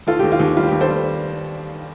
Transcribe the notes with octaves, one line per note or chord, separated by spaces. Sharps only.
D#2 F4 A4
G4
D#2
F4
D#2 G4
G3 F4
G4
D#2
A4 C5
G3